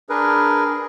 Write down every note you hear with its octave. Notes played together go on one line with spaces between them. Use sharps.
D4 G#4 A#4 B4